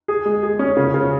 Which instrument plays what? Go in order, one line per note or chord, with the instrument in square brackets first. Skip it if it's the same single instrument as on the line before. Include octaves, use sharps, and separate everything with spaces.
[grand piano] G#4
G#3
G#4
C#4
C#3
C#3